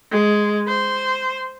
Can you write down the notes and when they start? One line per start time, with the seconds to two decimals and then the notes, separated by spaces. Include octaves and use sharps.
0.11 G#3
0.67 C5